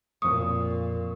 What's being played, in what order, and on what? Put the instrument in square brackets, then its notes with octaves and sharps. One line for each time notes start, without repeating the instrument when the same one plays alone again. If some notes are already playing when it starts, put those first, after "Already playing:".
[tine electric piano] F2 C#6 [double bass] A#2 [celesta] D#6